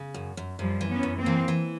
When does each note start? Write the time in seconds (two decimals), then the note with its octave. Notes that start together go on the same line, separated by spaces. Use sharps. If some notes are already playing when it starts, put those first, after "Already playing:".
Already playing: C#3
0.14 F#2
0.37 F#2
0.58 F#2 F3 G3
0.81 E3
0.88 B3 C#4
1.03 F#2
1.18 A#3 C4
1.26 E3
1.48 E3